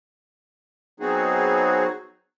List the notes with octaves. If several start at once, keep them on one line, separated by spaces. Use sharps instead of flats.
F#3 B3 C4 D#4 F#4 G#4